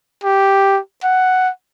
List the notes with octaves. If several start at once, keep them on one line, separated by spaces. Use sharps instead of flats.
G4
F#5